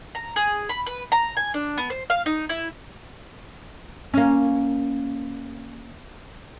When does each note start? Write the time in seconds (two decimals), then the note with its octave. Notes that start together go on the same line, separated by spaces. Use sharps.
0.15 A#5
0.36 G#4
0.69 B5
0.86 B4
1.12 A#5
1.37 G#5
1.54 D4
1.78 B3
1.90 C5
2.10 F5
2.26 D#4
2.49 E4
4.14 A#3 C#4